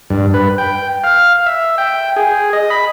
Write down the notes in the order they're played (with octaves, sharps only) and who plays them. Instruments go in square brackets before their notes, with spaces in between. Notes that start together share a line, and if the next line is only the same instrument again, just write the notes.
[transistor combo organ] G2
B4
G5
F5
E5
G5
G#4
D#5
B5